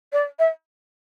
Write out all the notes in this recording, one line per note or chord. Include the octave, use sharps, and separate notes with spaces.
D5
E5